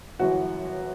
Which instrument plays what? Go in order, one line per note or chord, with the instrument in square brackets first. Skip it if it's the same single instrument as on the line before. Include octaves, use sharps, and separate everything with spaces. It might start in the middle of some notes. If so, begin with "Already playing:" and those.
[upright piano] G1 F#2 E3 F#4